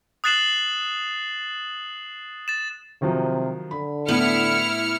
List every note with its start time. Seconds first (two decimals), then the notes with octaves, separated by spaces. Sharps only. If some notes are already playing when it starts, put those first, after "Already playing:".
0.24 D#6 F#6 A6 C7 E7 F#7
2.48 A6 E7
3.02 C3 D#3 F3 F#3
3.71 D3 B5
4.08 A2 B3 E4 F6 C#7